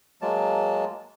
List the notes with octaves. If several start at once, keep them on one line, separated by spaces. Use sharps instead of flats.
F#3 G#3 A#3 A5